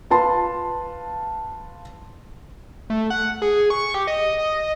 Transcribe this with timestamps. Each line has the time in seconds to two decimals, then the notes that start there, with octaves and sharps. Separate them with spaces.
0.10 F4 B4 A5 C6
2.90 A3
3.10 F#5
3.42 G#4
3.70 C#6
3.94 G4
4.07 D#5